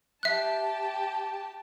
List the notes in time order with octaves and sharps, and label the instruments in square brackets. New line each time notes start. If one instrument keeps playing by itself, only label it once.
[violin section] G4 A5 [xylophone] E5 F#6